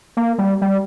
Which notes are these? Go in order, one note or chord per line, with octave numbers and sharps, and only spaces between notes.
A#3
G3
G3